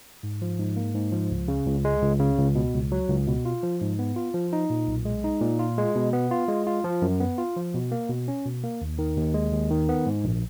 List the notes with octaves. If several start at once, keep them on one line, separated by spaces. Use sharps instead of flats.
G#2
F3
G#2
A#3
G#2
F3
C#2
C#3
C#2
G#3
C#2
C#3
C#2
B2
C#2
F#3
C#2
B2
F4
F3
G#2
B3
F4
F3
D#4
A#2
B1
G#3
D#4
A#2
F4
G#3
B2
B3
F4
G#3
F4
F3
F#2
B3
F4
F3
B2
A#3
B2
C#4
B2
A#3
D#2
D#3
D#2
G#3
D#2
D#3
B3
G#2
A#1